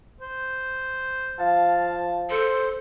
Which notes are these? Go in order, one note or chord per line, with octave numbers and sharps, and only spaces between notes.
C5
F3 F5 A5
A4 C5